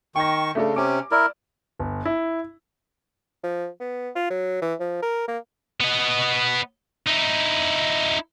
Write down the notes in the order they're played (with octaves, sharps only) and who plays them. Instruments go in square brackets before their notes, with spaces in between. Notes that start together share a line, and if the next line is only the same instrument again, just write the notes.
[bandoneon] D#3 C#6 [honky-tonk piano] G5 A#6
[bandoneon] C#3 [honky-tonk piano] A3 D4 A4
[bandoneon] C3 C#4 [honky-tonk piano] D6
[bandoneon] E4 A#4 [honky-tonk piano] D5
[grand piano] G1
E4
[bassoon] F3
B3
F4
F#3
E3
F3
A#4
A#3
[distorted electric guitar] B3 D#5
D#4 E4